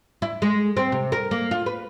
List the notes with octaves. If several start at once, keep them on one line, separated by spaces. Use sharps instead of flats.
E4
G#3
C4
C3
A#4
A#3
F4
B4